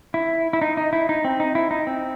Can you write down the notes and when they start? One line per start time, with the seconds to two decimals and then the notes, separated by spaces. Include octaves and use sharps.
0.14 E4
0.53 E4
0.62 D#4
0.77 D#4
0.93 E4
1.09 D#4
1.25 C4
1.40 D#4
1.55 E4
1.71 D#4
1.87 C4